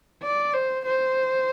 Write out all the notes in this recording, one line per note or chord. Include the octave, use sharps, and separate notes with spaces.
D5
C5
C5